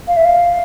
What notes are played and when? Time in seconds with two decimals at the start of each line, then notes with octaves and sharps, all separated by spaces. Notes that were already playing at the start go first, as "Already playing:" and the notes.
0.08 F5
0.17 E5
0.25 F5